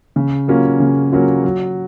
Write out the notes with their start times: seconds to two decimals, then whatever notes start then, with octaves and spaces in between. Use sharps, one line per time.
0.16 C#3
0.48 F#3 A#3 C#4 F4
0.80 C#3
1.12 F#3 A#3 C#4 F4
1.44 F#3